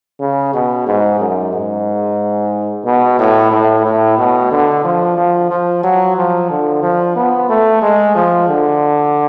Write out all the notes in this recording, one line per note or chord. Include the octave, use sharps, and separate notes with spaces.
C#3
B2
G#2
F#2
G#2
B2
A2
A2
A2
B2
D3
F3
F3
F3
F#3
F3
D3
F3
B3
A3
G#3
F3
D3